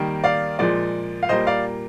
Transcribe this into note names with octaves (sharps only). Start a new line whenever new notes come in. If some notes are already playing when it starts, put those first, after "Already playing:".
Already playing: D#3 G3 A#3
D5 F5
A#2 F3 G#3 D5
F5
A#2 G3 A#3 C5 D#5
D5 F5